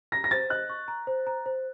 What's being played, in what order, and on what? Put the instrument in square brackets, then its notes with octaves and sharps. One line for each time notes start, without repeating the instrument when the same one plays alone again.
[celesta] A#5 [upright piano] A#6
[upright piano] A#6
[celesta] C5 [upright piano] A6
[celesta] D#5 [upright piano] F#6
[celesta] C#6
A#5
C5
A#5
C5